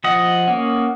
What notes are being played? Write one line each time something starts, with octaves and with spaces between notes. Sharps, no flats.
F3 D#5 F#5
A#3 C#4